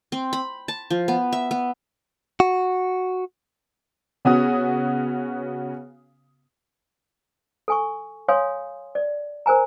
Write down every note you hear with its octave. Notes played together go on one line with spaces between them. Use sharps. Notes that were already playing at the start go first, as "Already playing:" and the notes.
C4
B5
A5
F3
B3
E5
B3
F#4
C#3 B3 C#4 F#4 D#6
A4 G#5 C#6
C#5 F5 G#5 C6 D#6
D5
A#4 C5 G#5 A#5